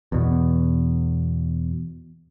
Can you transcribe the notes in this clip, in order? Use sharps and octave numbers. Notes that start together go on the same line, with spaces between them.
E2 B2